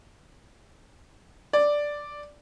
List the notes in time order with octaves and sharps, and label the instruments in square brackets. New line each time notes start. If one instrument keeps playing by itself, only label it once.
[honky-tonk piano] D5